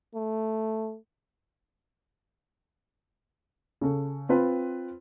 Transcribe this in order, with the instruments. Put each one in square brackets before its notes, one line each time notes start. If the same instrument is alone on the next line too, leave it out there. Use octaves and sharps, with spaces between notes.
[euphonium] A3
[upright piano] C#3 A4
C4 F4 B4